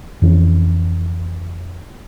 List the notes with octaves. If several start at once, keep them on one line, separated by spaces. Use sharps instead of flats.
F2 E3 C#4